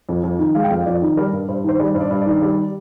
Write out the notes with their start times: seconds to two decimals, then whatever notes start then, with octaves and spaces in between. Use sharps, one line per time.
0.09 F2
0.24 F2
0.39 D#3
0.55 G#3 F5
0.64 G5
0.70 F2 F5
0.86 F2 D5
1.02 D#3
1.17 G3 A#4
1.33 G2
1.48 G2 C5
1.64 D#3 C5
1.80 G3 D5
1.94 G2 C5
2.00 D5
2.11 G2
2.21 D5
2.26 D#3
2.42 G3